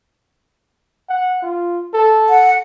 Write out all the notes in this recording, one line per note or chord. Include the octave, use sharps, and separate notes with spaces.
F#5
F4
A4
F#5